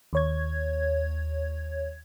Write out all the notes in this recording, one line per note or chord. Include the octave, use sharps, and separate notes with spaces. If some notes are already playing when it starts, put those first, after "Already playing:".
D#2 C#5 G#6